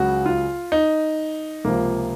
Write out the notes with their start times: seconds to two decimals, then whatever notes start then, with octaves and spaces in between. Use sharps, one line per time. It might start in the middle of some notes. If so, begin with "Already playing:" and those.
Already playing: C#2 C#3 F#3 F#4
0.26 F4
0.72 D#4
1.64 C#2 C3 F3 A#3